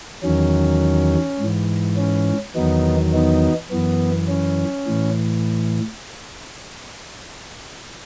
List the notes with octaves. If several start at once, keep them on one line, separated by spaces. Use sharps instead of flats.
E2 D#3 F#3 C#4
G#2 E3
C#4
E2 D#3 F#3 B3 D#4
B3 D#4
F#2 E3 B3
C#4
A2 E3